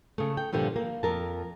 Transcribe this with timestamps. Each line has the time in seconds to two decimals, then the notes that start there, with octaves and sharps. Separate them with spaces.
0.18 C#3 A3
0.37 G5
0.53 G2 A#2 D3 F3 G3
0.76 A#3
1.03 F2 A#4 A5